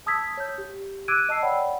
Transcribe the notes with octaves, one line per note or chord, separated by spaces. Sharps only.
A5 D#6 E6 G#6 B6
C#5 G6
G4
D6 E6 F#6 G#6 D7 D#7
D#5 A5 E6 C7
C#5 D5 F#5 G5 B5